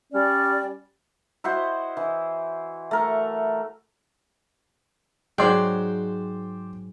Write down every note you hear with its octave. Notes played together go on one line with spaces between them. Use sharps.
G3 C#4 D5
E4 F#4 C5 D#5
E3
A3 A#4 C#6
G#2 F#3 G#3 C5 D5 G5